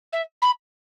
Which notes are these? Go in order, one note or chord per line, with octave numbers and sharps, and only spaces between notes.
E5
B5